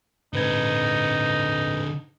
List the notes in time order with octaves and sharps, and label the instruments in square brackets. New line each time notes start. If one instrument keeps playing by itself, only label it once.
[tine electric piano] G#2 B4 G#6 [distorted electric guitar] D3 C4 [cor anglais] D#4